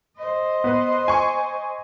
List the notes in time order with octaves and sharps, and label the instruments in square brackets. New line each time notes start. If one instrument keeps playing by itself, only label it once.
[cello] C5 D#5
[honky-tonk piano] B3 B4
G#5 C#6